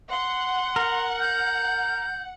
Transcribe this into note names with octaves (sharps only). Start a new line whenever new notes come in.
F#5 C6
A#4
G6